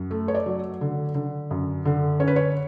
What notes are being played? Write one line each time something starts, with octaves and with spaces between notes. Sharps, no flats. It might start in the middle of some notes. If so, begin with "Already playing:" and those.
Already playing: F#2
A3
C#5
D5
F#3
D3
D3
F#2
D3
C#4 C#5
B4
C#5